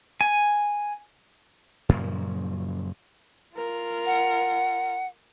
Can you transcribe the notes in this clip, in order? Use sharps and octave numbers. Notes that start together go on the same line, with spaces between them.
G#5
F#2 A#2 C#3 F3
F4 A#4
F#5